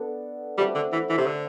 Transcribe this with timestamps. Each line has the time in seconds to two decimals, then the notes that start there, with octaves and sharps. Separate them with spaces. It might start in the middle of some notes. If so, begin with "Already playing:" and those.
Already playing: B3 D4 A4
0.58 G3 A3 C4 F#4
0.75 D3
0.92 E3
1.10 E3
1.18 C3
1.26 D3